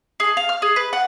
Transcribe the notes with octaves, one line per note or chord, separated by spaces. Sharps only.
G#4
F5
F6
G#4
B4
F#5